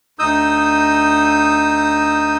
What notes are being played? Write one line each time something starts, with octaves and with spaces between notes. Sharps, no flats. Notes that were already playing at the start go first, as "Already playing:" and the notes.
D2 D#4 D#6 E6 G6